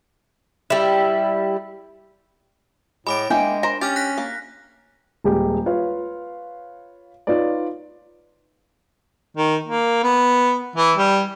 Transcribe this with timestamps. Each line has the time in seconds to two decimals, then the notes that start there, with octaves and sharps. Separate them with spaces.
0.70 G3 E4
3.07 A2 G#3 B5 D6 D7
3.30 G#3 A#3 D4 E4 G5
3.63 A#4 C5 A#5
3.81 C#4 G4 F6 A6
3.96 F#6 A#6 B6
4.18 A#3
5.24 D#1 G#3 G4 G5
5.66 F4 B4 C#5 F5
7.27 D#4 F4 B4 C#5 D5
9.37 D#3
9.67 A#3
10.04 B3
10.76 E3
10.97 G3